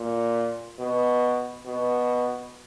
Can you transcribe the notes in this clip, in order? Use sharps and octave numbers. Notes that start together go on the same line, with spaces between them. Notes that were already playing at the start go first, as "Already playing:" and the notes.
Already playing: A#2
B2
B2